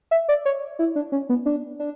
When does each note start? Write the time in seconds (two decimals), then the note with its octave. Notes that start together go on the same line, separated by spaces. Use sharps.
0.11 E5
0.28 D5
0.45 C#5
0.79 E4
0.96 D4
1.12 C#4
1.29 B3
1.46 D4
1.80 D4